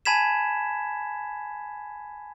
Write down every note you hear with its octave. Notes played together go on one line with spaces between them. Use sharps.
G#5 A5 B5 G#6 B6 E7